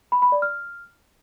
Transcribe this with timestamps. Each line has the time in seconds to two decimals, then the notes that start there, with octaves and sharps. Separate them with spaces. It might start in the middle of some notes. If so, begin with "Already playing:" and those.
0.12 B5
0.22 B5
0.32 D5
0.42 F6